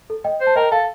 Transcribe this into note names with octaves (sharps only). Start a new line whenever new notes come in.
A4
D#5 G5
C5
A5
A#4 D#5 G5
A4 F5 A5